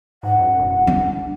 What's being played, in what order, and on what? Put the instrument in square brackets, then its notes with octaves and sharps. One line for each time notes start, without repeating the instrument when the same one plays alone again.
[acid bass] G#2 [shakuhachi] F#5
[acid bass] F#2
E1
[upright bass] D4